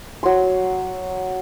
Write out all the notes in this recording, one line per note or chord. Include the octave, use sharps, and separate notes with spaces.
F#3 C6